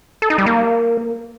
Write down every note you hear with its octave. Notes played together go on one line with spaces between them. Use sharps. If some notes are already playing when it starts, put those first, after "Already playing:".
A4
D#4
G3
A#3